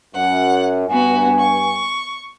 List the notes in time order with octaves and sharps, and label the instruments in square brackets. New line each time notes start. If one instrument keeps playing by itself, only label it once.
[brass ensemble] F#2 [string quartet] F#5
[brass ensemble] G2 G#5 [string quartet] B3 F#4
[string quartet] C#6